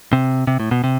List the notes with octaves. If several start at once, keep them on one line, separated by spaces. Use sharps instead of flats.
C3
C3
A2
B2
C3